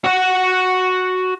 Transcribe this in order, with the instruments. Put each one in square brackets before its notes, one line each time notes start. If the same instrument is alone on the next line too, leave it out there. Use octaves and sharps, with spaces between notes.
[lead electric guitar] F#4 F#5